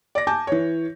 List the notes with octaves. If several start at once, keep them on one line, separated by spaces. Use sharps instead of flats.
D5 A#6
G#5 A5 D6 G6
E3 C#5